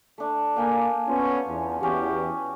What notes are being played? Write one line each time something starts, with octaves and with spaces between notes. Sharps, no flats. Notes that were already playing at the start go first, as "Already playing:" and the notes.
A3 D4
A#3 F5 G5 G#5
B3 C#4 F4
E2
E2 C#4 F#4 G4